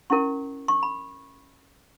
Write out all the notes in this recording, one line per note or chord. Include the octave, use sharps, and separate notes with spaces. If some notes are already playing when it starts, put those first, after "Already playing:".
C#4 E4 A#4 C#6
C#6
B5